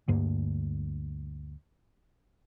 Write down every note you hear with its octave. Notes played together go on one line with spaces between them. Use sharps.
D2 G2 A#3